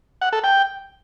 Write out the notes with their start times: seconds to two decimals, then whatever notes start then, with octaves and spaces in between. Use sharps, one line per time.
0.22 F#5
0.33 A4
0.44 G5